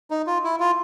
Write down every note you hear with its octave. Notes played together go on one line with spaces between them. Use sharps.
D#4
F4
E4
F4